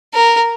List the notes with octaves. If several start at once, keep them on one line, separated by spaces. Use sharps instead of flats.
A#4